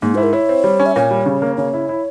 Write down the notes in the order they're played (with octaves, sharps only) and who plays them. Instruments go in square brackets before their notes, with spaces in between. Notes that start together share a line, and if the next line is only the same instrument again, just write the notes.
[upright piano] G#2 [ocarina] A#3
[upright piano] E4 [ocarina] C5
[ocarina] A#4
[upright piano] E4 [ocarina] C#5
[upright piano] C4
G3
C#4
[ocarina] E5
[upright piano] A#2 [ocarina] C#5
[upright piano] G3
C#3
A#3
[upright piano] C#3 [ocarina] C#5
[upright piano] E4
E4